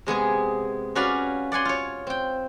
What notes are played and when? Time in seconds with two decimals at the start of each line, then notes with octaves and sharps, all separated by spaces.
0.06 C3 G#3 B3 G#4
0.95 C#4 F#4 B4 D5 F5
1.52 D5 F#5 G#5 C6
1.65 F4 C#5
2.07 C4 G5